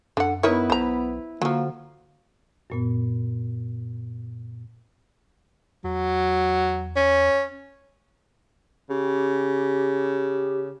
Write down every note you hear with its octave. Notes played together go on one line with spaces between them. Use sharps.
F#2 D3 F#5
B3 D#4 E4 A#4 B4 C#5
B1 C5 A#5
D3 F3 F#3 A#3
F#2 A#2 B3
E2 F#3
C#4
C#3 G4